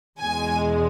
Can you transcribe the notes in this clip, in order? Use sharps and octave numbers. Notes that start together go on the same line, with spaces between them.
E2 B2 G#3 G#5